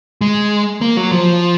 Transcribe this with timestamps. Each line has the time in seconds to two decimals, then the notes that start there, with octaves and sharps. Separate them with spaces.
0.21 G#3
0.81 A#3
0.97 F#3
1.11 F3